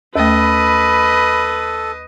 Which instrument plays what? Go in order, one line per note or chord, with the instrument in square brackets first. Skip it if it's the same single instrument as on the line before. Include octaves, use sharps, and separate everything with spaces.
[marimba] D#2 A3 [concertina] A4 [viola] B4 D#5 [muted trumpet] B5